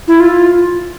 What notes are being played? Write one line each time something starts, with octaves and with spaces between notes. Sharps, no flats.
E4
F4